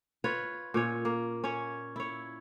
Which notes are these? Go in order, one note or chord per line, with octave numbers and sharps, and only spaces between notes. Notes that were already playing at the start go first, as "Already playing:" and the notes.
F4 B4 C#5
A#2 C#4 C#5
A#3
C#4 C#5
E4 C#5